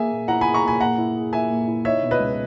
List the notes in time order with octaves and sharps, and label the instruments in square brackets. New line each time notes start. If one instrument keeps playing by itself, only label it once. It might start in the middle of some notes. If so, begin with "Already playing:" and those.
Already playing: [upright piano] A#3 G#4 [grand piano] E5 G#5
[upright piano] A#2
[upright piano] E4 [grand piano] F#5 A#5
[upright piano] G#4 [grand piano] G#5 B5
[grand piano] A#5 C#6
[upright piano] A#3 [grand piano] G#5 B5
[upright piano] A#2 [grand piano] F#5 A#5
[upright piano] E4
G#4
[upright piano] A#3 [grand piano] E5 G#5
[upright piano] A#2
E4
[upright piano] D#4 [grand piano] C#5 E5
[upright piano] B2
[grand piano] B4 D#5
[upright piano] C#2